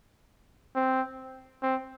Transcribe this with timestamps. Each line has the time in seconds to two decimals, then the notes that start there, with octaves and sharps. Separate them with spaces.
0.76 C4
1.62 C4